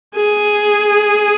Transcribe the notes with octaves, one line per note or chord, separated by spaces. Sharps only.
G#4